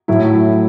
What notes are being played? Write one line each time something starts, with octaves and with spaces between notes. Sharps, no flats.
A2 F#3 A3 E4